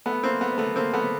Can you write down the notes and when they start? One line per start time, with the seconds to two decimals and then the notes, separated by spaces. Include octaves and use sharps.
0.06 A3 B3
0.24 A#3 C4
0.41 A3 B3
0.58 A3 B3
0.76 A#3 C4
0.94 A3 B3